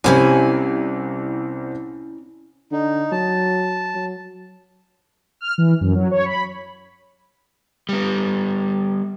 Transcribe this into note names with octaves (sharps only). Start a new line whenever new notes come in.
C2 C4 C#4 E4 G4 G#5
D3 D#4
F#3 A5
F#3
F6
E3
F#2
F#3
C#5
B5
G3 B3